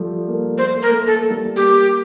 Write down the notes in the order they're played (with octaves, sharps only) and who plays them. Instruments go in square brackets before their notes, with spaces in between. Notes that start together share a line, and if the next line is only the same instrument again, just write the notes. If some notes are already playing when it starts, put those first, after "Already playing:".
Already playing: [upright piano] F3 G3 A3
A#3
A3
[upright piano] A3 [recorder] C5
[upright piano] A#3
[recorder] A#4
[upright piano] A3
[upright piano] A#3 [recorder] A4
[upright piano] G3
A3
[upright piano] A#3 [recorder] G4